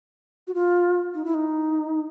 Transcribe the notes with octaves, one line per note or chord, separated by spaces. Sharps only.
F#4
F4
D#4
E4
D#4